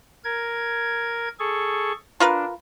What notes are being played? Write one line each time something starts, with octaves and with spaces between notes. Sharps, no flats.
A#4 G#6
G#4 A4 C#6
D4 F4 A#4 B4